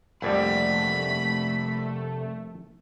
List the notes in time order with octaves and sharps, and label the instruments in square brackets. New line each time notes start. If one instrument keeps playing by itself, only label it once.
[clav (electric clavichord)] A#1 F2 G3 [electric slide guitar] C3 A4 F#5 [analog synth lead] A3 [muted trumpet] B5